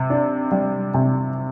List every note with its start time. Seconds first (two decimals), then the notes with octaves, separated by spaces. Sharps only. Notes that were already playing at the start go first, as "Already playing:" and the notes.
Already playing: C3
0.10 D4
0.51 G3
0.94 C3